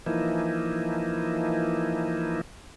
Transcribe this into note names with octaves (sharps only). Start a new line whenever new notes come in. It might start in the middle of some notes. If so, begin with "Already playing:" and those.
E3 F3 A#3 D#4 E4